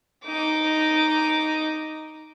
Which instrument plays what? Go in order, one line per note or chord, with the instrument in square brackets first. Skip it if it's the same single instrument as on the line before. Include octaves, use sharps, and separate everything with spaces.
[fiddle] D#4 D6